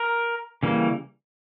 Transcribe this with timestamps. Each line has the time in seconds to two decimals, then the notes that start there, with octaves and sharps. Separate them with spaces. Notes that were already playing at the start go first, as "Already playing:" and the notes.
Already playing: A#4
0.63 C#3 E3 G3 A#3